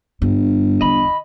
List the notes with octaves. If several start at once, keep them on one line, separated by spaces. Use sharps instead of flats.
G1 G2
E2 D3 D#5 B5